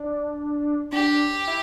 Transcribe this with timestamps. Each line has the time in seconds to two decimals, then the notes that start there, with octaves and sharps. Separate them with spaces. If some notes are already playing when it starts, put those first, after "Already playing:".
Already playing: D4
0.92 D4 G4
1.47 E4